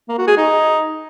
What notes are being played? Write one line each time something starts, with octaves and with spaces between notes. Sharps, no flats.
A#3
F#4
G#4
D#4